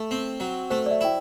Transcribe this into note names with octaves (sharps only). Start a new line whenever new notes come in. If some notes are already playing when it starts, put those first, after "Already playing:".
Already playing: A3
C4
F#3
A3 C5
D5
E5
E4 G5